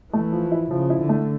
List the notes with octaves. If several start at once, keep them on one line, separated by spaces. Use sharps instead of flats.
E3 A3
F3
E4
C#3 F3
E4
D3
A3